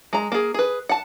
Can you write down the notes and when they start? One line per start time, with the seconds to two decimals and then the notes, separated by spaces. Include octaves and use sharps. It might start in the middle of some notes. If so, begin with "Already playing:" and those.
0.13 G#3 A#5
0.32 A#3 G#4
0.54 G#4 B4
0.89 F#5 A5